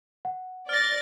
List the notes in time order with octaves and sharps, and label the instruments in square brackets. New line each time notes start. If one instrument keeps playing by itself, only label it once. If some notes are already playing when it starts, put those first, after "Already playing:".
[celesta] F#5
[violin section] D5 A6 [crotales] F6 A#6